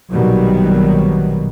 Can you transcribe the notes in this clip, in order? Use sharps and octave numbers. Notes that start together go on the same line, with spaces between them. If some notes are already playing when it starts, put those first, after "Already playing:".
A#1 B2 D#3 F#3 G3